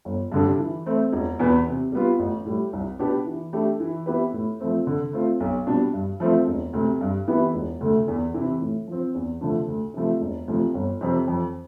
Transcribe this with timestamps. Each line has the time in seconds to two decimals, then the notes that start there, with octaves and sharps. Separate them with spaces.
0.05 G1
0.32 G2 D3 G3 D4
0.59 E3
0.86 A3 C4
1.13 E1
1.39 E2 B2 B3
1.66 C3
1.92 G3 B3 F4
2.19 A1
2.45 A2 G3
2.73 C2
2.99 B2 B3 D4 G4
3.26 E3
3.53 A3 D4 G4
3.80 E3
4.06 B3 E4 G4 B4
4.33 A2
4.60 F3 A3 C4
4.87 D3
5.13 A3 C4 F4
5.40 B1
5.67 B2 G3 D4
5.93 G2
6.20 F3 A3 C4 F4
6.47 E1
6.73 D2 C3
7.01 G2
7.27 E3 B3 E4 G4
7.54 E1
7.81 D2 D3 A3
8.08 E2
8.34 C3 E3
8.61 A2
8.87 F3 C4
9.14 E2
9.41 D3 F3 A3 D4
9.68 D2
9.94 C3 F3 A3
10.21 E1
10.48 D2 C3 F3
10.74 G1
11.01 F2 C3
11.28 F2